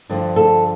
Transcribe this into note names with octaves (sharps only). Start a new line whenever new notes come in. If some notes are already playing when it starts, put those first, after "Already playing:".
G2 D3 F3
A4